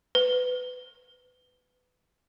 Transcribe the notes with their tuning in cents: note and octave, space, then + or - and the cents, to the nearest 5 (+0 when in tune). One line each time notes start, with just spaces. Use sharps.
B4 +20